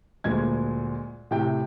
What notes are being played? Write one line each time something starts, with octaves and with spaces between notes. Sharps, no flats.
D2 A#2 G#3 G#6
A2 C3 G5